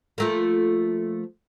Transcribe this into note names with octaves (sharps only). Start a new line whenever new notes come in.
F3 A3 A#3